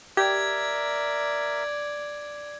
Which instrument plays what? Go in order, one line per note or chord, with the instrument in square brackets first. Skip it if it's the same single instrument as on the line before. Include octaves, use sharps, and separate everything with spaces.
[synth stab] G4 [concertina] A#4 E5 [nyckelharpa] D5 [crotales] G#6